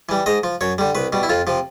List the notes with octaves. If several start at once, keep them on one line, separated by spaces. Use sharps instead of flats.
E3 G3
G#2 D#5
F3
F#2 C#5
D3 G3
C2 B4
B2 G3
E4
F2 F4
C3 F3